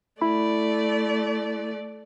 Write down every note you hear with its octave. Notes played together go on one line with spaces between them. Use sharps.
A3 E4 D5 B5